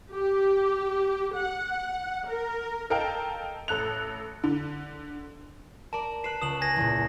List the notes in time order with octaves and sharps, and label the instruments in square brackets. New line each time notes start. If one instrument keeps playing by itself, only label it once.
[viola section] G4
F#5
A#4
[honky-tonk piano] A4 A#4 D#5 F5 G5 A5
A1 A4 F#6 F7
D3
[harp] A#4 D5 [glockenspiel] A5
[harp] B4 B5 F#6 [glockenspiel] C7 E7
[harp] C#2 [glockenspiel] D#6 E7 F#7
[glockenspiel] G#5 G#6 A#6
[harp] E2 A#2